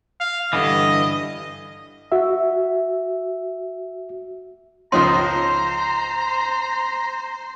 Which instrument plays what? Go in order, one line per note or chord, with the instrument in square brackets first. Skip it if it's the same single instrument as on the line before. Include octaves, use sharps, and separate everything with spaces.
[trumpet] F5
[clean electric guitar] G2 D3 E3 [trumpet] D#5
[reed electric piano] F#4 E5
[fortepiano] C#2 F3 D#4 [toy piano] C#4 C#5 C6 [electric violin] C5 [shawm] A#5